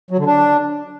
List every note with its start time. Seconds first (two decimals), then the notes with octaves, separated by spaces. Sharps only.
0.11 F#3
0.18 D3
0.26 D4